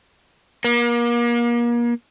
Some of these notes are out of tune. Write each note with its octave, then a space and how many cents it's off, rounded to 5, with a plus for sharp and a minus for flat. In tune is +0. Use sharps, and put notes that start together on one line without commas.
A#3 +35